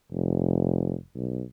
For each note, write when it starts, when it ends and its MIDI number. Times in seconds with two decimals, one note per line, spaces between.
0.12 0.96 29
1.15 1.43 35